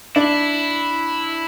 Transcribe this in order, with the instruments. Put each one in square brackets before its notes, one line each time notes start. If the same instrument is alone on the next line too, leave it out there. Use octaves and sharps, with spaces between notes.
[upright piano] D4 [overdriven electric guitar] E4